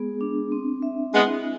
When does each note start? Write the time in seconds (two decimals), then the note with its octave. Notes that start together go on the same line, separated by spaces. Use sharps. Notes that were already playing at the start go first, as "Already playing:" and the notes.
Already playing: G#3 B3 G#4
0.21 D4
0.52 C4
0.82 E5
1.14 G#3 B3 E4